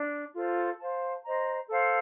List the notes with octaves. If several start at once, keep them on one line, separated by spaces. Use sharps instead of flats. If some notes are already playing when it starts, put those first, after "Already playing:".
Already playing: D4
F4 A4 C5
C5 F5 A5
C5 D#5 A#5
A4 C5 F5